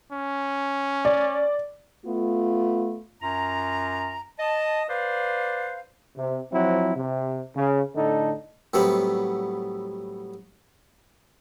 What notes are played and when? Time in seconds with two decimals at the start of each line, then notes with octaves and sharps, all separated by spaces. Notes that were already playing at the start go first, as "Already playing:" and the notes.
0.12 C#4
1.05 D5
2.06 A3 B3 F4
3.22 F#2 F4 A#5
4.38 D#5 A5
4.89 B4 C5 D5 F5
6.17 C3
6.52 F3 F#3 C4 E4
6.95 C3
7.55 C#3
7.96 A2 D3 D#4 A4
8.74 A2 F#3 G3 B3 C4 E4